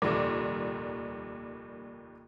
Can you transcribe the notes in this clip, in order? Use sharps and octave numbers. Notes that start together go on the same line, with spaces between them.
F1 D#2 A#2 G3 D6